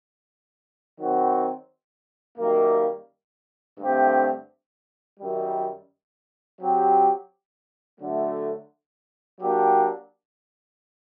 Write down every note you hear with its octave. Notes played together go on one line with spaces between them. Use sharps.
D#3 F#3 C4 F#4
F#2 D#3 G3 A#3
G2 D3 A3 C4 G4
F#2 D#3 G3
F#3 C4 G4
D3 F#3 A3
F#3 A#3 D4 G4